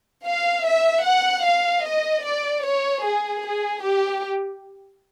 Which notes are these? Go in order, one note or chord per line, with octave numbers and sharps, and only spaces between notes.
F5
E5
F#5
F5
D#5
D5
C#5
G#4
G#4
G4